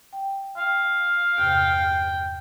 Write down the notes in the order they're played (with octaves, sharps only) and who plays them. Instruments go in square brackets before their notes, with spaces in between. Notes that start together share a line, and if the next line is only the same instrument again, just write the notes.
[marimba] G5
[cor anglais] F5 [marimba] G5
[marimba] E2 G2 C3 [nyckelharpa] G5